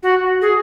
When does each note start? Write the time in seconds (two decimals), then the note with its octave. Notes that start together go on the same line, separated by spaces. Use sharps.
0.03 F#4
0.42 G#4